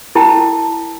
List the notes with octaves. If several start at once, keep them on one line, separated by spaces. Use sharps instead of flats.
E4 A#4 G5 A5 A#5